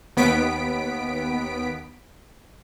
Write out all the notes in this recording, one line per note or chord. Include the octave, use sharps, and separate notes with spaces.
D#2 B3 B6 D7